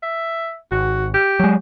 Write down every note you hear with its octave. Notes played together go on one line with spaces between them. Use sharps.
E5
G#1 F#4
G4
F#3 G#3